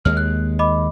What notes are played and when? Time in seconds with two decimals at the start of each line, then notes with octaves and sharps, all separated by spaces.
0.05 D#2 G#3 F6
0.17 F#6
0.59 D#5 B5 D6